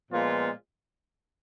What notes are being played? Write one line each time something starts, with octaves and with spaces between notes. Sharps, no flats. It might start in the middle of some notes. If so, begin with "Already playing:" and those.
A#2 F3 G#3 B3 F4